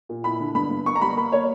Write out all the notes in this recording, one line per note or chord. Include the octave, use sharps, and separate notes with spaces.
A#2
E4 B5
D3
G2 B5
G2
A#3 C#6
A#5
G3 B5
A#3 B5
A#3 C#5